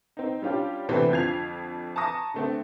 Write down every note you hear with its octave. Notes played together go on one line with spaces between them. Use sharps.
C4 D#4
G3 C#4 D4 F4 G4
C3 E3 A3 B3 C4 D4
F2 D3 F3 G#6 C7 F7
A5 A#5 C#6 D#6 A#6
D3 A3 C4